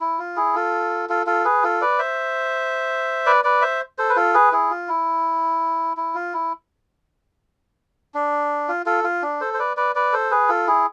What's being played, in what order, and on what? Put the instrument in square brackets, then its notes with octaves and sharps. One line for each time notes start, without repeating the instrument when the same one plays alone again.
[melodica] E4
F4
E4 G#4
F4 A4
F4 A4
F4 A4
G#4 B4
F4 A4
B4 D5
C5 E5
B4 D5
B4 D5
C5 E5
A4 C5
B4
F4 A4
G#4 B4
E4 G#4
F4
E4
E4
F4
E4
D4
F4
F4 A4
F4
D4
A4 C5
C5
B4 D5
B4 D5
B4 D5
A4 C5
G#4 B4
F4 A4
E4 G#4